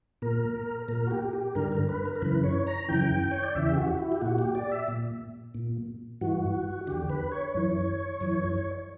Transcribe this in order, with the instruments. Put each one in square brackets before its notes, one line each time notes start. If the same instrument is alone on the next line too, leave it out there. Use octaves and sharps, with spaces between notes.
[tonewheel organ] A#2 A#4
A#2 A#4
F#4
G4
G4
G2 D3 A#4
A#4
B4
A#4
A#4
F#2 C#3 E3 B4
C#5
A#5
F#2 C#3 E3 G5
C#5
D5
E2 C#3 E3 E5
G4
F#4
E4
G4
A#2 F#4
G4
D5
E5
A#2
A#2
G2 E3 F#4
E2 D3 G4
B4
C#5
F#2 E3
F#2 E3